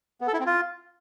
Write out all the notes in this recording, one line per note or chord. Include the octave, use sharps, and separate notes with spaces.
B3
A4
E4
C4
F4